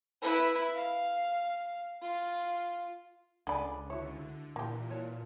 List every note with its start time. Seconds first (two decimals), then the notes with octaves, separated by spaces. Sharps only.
0.22 E4 B4
0.74 F5
2.02 F4
3.47 C#2 D3 D4 D5 G#5 B5
3.90 D3 E4 F#4 C#5
4.56 A#2 E3 A#3 G4
4.90 F#4 C#5 A5